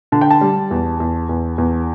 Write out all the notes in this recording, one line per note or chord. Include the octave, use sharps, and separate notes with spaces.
D3 A5
G5
A5
G3
E2
E2
E2
E2